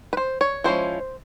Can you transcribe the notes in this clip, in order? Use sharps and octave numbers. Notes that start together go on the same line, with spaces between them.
B4
C5
C#5
F3 G#3 C#4 E4 C5